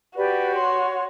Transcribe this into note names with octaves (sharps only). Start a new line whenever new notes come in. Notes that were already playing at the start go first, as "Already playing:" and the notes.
F#4 G4 B4 D5
C#5 C6